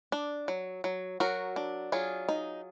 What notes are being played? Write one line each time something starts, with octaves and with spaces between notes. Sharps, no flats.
D4
F#3
F#3
F#3 F#4 A#4
D4
F#3 F4 G#4
D#4